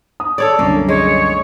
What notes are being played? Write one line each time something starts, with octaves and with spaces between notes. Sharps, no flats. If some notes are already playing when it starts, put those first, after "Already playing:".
D#6
A4 C#5 D5
C2 F#2 D3 A#3 C#4
G#3 C#5